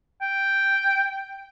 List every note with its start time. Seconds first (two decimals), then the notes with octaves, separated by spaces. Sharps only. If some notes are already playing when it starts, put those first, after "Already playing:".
0.22 G5